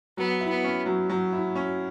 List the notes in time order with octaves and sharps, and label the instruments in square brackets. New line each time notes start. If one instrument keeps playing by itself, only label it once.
[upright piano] F#3 [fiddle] B3
[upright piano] E4
[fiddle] B3
[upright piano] C#4
F#3
F#3
E4
C#4